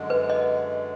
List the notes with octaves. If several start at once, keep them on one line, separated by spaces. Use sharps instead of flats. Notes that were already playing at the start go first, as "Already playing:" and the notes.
Already playing: F#2 D3 G#3
B4
D#5